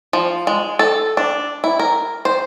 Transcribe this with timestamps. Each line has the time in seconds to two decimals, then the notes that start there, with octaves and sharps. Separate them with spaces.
0.13 F3
0.47 G#3
0.79 A4
1.17 D4
1.64 E4
1.79 A#4
2.25 C5